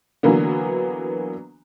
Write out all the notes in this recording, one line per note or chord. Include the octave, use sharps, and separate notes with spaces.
D3 E3 F#3 A#3 B3